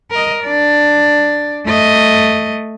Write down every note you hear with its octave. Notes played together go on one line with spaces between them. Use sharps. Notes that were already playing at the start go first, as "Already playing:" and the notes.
A#4 D#5
D4 D5
A3 D#5